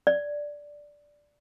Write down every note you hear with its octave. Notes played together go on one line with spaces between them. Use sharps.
D5